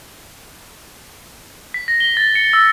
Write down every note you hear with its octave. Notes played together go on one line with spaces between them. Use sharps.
B6
A#6
G7
A6
C#7
E6